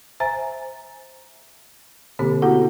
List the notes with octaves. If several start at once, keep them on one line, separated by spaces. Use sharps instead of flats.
C5 E5 G#5 A#5 A6
B2 D3 A#3 C4 G4
B3 E4 F#4 A4 F#5